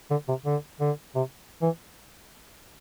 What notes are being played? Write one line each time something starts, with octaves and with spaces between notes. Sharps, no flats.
D3
C3
D3
D3
C3
E3